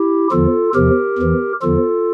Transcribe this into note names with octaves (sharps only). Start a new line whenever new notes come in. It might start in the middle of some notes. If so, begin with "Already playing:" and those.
Already playing: E4 G4
E2 D3 F3 F4 A4
E2 C3 F3 G4 A#4
E2 E3
E2 D3 F3 F4 A4